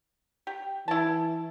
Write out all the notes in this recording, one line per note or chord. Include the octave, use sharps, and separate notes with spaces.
G4
E3 E4 A5